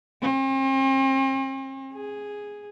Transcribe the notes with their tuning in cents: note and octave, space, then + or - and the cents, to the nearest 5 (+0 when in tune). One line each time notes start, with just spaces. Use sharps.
C4 +45
G#4 -5